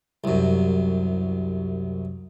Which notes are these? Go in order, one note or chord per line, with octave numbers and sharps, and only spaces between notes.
C2 F#2